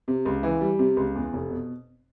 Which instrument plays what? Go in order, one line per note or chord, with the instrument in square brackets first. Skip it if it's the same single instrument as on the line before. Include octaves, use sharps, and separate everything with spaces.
[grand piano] C3
C#2
E3
G3
C3
C#2
E2
F1
B2